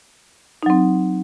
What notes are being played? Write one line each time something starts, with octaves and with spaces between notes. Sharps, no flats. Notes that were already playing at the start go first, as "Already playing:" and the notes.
F#3 C4 D#4